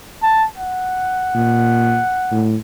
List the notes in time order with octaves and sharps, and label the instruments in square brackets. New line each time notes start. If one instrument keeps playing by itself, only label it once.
[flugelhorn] A5
F#5
[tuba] A#2
A2